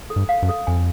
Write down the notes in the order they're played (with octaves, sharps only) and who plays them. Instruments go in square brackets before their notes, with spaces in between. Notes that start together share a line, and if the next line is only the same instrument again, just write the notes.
[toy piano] A4
[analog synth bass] G2
[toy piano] F5
[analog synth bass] F#2
[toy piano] A4
[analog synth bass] F2 [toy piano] G#5